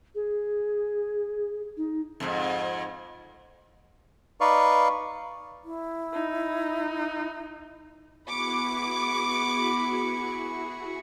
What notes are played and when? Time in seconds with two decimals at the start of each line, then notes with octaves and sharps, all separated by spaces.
0.15 G#4
1.77 D#4
2.20 F2 G#2
4.41 D#4 B4 D5 F5 C#6
5.65 E4
6.13 D#4
8.29 B3 E4 F#4 G#4 B5 C#6 D6